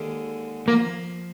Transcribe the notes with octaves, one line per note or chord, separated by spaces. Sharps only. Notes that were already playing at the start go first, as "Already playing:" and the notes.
Already playing: D#2 D3 G#3
F3 A#3